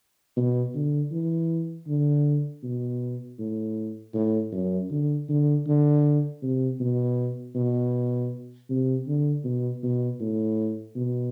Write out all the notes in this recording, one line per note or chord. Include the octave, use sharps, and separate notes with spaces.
B2
D3
E3
D3
B2
A2
A2
F#2
D3
D3
D3
C3
B2
B2
C3
D3
B2
B2
A2
B2